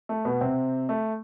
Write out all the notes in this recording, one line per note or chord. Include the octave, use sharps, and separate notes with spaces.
A3
B2 B3
C3 C4
A3